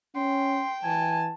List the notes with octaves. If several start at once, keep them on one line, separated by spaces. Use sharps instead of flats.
C#4 G5 C6
E3 G#5 A5